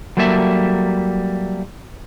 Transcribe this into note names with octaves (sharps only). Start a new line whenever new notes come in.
F#3 G3 A#3 A4 B4 E5